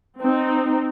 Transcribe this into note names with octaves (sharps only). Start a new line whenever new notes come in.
C4 D#4